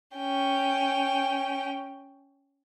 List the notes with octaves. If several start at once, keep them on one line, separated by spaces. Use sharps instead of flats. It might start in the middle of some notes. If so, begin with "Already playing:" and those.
C#4 G5